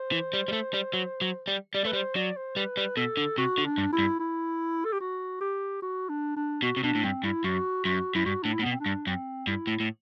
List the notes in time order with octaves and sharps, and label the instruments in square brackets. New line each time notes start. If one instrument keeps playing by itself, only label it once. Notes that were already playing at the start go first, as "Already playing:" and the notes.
Already playing: [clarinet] C5
[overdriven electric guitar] E3
G3
G3
A3
G3
F#3
F#3
G3
[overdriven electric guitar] G3 [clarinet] D5
[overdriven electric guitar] A3 [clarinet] B4
[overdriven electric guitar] G3
[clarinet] C5
[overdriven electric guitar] F#3 [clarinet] D5
[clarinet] C5
[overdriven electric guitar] G3 [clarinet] B4
[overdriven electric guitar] G3
[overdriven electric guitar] B2 [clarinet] A4
[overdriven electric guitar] D3
[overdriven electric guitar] C3 [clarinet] F#4
[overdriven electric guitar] D3
[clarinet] D4
[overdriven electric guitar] G2
[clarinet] E4
[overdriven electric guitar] G2
[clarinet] E4
A4
G4
F#4
G4
F#4
D4
D4
[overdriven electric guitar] B2 [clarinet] F#4
[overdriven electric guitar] C3
[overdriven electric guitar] B2 [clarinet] D4
[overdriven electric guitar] A2
[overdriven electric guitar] G2 [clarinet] C4
[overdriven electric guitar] G2 [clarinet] E4
[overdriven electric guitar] F#2 [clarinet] F#4
[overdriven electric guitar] F#2 [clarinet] F#4
[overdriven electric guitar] F#2 [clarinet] E4
[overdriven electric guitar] G2 [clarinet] F#4
[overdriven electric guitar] A2 [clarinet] D4
[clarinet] E4
[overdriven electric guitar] A2
[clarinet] B3
[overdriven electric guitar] B2
[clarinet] C4
D4
[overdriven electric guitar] G2
[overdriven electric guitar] F#2 [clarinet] C4
[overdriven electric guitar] G2 [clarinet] E4
[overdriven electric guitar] A2
A2